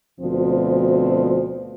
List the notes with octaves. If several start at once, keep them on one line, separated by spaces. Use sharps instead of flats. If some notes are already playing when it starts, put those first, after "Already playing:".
D2 B2 F3 C4